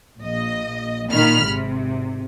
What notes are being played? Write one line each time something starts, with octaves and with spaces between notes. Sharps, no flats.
A#1 D#5
A#2 D#3 B5 F6
G#1 C3